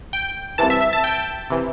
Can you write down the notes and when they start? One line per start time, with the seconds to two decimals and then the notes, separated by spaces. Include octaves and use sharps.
0.13 G5
0.58 C2 C3 E3 A5
0.70 E5
0.81 E5
0.93 A5
1.04 G5
1.50 C3 E3